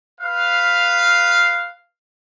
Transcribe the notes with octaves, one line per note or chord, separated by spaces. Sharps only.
B4 F5